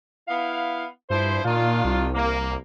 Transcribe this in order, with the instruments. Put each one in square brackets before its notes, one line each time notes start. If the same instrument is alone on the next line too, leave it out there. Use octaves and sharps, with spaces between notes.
[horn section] B3 E4 F5
[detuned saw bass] G2 [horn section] F3 E4 C5
[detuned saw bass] A#2 [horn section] D#3 D4 F4
[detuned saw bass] C2
[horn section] A#3